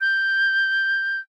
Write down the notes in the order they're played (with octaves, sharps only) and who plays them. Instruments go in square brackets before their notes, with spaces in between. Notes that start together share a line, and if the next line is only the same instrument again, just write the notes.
[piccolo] G6